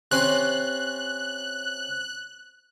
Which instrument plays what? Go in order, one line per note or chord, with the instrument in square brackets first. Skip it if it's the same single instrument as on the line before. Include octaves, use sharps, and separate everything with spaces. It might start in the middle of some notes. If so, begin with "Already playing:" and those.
[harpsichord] C3 C#4 C6 [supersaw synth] F#6